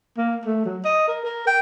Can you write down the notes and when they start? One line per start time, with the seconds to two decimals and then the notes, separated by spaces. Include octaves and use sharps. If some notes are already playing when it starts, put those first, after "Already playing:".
0.17 A#3
0.46 A3
0.65 F#3
0.85 D#5
1.08 A#4
1.25 A#4
1.47 G5